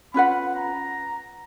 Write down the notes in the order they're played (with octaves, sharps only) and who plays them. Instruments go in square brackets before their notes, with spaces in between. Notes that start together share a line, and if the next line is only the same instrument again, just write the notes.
[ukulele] C#4 F4 B4 F#5 [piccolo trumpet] B5
[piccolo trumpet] A#5